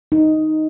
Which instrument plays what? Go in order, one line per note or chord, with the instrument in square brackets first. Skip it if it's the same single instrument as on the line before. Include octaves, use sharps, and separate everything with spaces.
[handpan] D#4